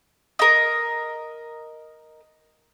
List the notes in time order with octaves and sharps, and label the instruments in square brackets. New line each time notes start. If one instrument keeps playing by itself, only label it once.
[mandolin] A#4 D#5